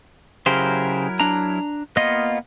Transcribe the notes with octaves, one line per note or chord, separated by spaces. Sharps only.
C#3 F#3 E4 G4 A#4 C5
D4 A#5
A#3 B3 F4 D#5